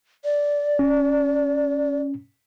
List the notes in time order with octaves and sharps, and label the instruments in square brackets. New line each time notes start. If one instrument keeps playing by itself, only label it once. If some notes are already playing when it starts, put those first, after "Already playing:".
[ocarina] D5
[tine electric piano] C#4